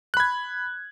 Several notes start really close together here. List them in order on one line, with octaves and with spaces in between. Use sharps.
F#6 B5 G#6